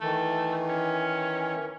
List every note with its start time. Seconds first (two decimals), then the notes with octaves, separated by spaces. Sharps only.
0.01 D#3 E3 A3
0.69 C#4